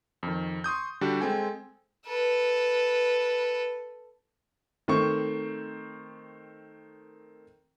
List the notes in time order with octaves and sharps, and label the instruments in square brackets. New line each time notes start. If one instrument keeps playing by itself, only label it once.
[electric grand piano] F2 D#3
C6 C#6 D#6 G6
D3 G3 D4 F#4 G4
G#3 C4 A4 G5 G#5
[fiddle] A4 B4
[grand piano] D#3 A3 C4 C#6